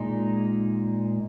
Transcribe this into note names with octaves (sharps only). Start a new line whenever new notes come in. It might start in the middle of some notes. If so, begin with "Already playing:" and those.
Already playing: A#2 G#3 D#4